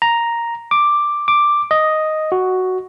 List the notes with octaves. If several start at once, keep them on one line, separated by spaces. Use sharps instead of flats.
A#5
D6
D6
D#5
F#4